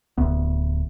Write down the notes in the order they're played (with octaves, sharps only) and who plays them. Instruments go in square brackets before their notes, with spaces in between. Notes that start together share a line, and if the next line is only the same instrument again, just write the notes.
[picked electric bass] D1 D2 B3